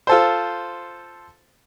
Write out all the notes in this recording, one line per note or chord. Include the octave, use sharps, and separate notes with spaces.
F4 A4 C5